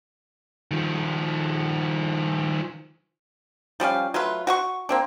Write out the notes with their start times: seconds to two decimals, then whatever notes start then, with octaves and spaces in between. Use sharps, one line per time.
0.71 D#3 F3
3.80 F3 G3 C#4 F5
4.14 F#3 A3 F4 B4
4.47 F#4 F#5 C#6
4.89 A#3 C4 D4